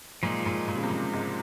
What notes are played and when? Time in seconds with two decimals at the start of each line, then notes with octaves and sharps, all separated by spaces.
0.23 A#2 F3 G#3 D#4
0.46 A#2
0.68 A#2
0.76 C#3
0.83 C3
0.90 A#2
1.13 G#2